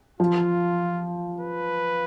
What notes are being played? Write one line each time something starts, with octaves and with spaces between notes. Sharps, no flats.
F3 F4
B4